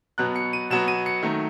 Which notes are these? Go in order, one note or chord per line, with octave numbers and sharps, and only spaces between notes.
B2 F#3 B3 F#6
C#7
D#7
B2 F#3 B3 E7
D#7
C#7
D#3 F#3 A3